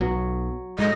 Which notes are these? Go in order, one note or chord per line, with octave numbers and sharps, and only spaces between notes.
B1 F#3 B3
A2 G#3 D#5